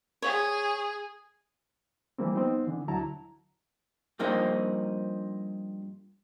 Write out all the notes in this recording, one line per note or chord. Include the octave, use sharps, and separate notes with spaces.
G#4 C#5
E3 F3 G3 A#3 C4
B3 C4 D#4
D3 E3
D2 D3 F#3 E4 A5 A#5
G2 F3 A#3 C4 D#4